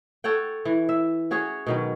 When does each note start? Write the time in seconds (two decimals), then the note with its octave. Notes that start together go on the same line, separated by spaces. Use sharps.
0.24 A4 C#5 F#5 G5
0.65 E3
0.89 E5
1.31 C#4 F#4 G#4 C#5
1.67 B2 D#3 F#3